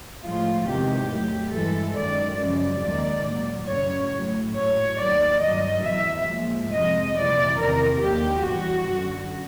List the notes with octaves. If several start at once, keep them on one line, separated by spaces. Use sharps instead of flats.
A2 F3 G#3 F4
E2 C3 D#3 G#3 G4
A2 F#3
G2 E3 G#3 A4
F#2 D#3 G#3 D5
F#2 C#3 F3 G#3 D5
D#2 D#3 G#3
A#2 F#3
F#2 C#3 F#3 C#5
A2 F#3
A2 F#3 C#5
D#2 D#3 F#3 D5
G2 D#3 F#3 D#5
E2 B2 F#3 E5
A#2 F3 G#3
F2 C3 F3 G#3 D#5
F2 C3 E3 G3 D5
E2 C3 D#3 A#4
D#2 D3 F3 G#3 G4
E2 B2 G3 F#4
F#2 D3 F#3